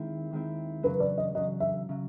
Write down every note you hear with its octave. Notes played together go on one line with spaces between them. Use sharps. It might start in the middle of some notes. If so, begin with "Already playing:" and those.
Already playing: D#2 D#3 G#3 C4 E4
D#2 D#3 G#3 C4 E4
E2 C#3 F#3 B4
D5
D#5
E2 C#3 F#3 D#5
E5
C#3 F#3